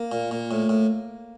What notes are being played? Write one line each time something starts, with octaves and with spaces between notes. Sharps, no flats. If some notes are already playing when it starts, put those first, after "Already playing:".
Already playing: A#3
A#2
A#2
A2
A2